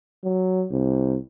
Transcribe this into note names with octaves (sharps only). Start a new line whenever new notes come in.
F#3
C2